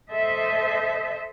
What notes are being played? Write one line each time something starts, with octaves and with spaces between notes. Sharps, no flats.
A4 C5 D#5 E5